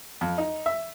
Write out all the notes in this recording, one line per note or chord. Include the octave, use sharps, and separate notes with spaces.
F2
D#4
E5